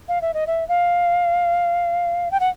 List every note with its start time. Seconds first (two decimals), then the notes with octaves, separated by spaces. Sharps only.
0.08 F5
0.22 E5
0.34 D#5
0.47 E5
0.68 F5
2.31 G5
2.40 F#5